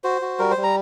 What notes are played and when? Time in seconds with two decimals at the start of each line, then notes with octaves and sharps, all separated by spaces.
0.04 F#4 C5
0.22 F#4
0.39 G3 A#4
0.51 C5
0.57 G3
0.63 A#5